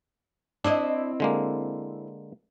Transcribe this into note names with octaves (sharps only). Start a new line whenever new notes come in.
C4 D4 E4 D#5
D3 G#3 A#3